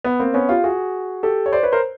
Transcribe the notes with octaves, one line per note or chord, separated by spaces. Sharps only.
B3
A#3 C4
B3 C#4
F4 G4
F#4 G#4
G4 A4
C#5
C5 D5
B4 C#5
A#4 C5